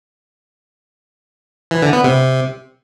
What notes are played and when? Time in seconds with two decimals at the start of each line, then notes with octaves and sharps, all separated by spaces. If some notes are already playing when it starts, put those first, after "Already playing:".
1.71 E3
1.82 D3
1.93 B3
2.04 C3
2.15 C3